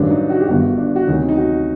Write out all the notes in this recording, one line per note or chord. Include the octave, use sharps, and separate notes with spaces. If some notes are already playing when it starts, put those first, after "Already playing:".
Already playing: A1 G2 D#3 F#3 D4
D#4
F#4
G4
G1 G2 D#3 F#4
D4
F#4
D2 C3 D#3 F#3 D#4
D#4
F#4